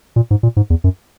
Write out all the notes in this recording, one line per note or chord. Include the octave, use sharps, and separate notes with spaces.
A#2
G#2
A#2
G#2
E2
F#2